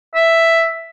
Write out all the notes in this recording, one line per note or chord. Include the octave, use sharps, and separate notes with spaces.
E5